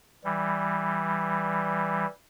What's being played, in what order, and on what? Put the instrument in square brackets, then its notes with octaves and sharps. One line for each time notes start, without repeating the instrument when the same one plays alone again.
[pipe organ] E3 G3